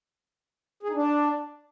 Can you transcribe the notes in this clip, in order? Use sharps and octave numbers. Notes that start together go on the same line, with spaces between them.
G#4
D#4
D4